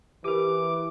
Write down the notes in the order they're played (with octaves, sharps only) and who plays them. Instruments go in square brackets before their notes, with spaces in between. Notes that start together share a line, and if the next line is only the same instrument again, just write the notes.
[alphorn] E3 [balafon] G4 A#4 [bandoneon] D6